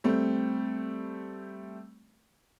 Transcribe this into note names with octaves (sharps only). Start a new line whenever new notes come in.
G3 A3 C4